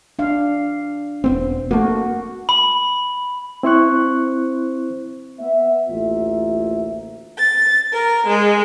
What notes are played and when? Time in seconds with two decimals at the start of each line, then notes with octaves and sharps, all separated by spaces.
0.19 D4 F5
1.24 E1 B3 C4
1.71 A3 A#3 F#4
2.49 B5
3.63 C4 E4 C5 C#6 F#6
5.40 B3 E5
5.88 A1 D2 A#3 F4 E5
7.38 A6
7.92 A#4
8.26 G#3